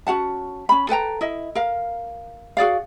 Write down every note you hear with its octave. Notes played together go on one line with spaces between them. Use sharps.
C#4 F#4 F#5 A5
C#4 B5
A4 B4 G5 A#5
E4 D#5
A#4 F5
F#4 G#4 D5 F5